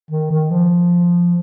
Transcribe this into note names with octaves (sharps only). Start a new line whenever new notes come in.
D#3
D#3
F3